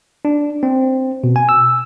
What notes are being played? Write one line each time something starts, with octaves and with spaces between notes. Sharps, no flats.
D4
C4
B2
G#5
E6